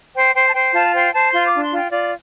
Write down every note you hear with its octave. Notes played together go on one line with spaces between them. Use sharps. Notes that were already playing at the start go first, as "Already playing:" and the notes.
C5 G5
C5 G5
A5
C5 G5
F4 A5
C5 G5
C5 A5
F4 C6
D6
D4
C6
F4
G5
F4 D5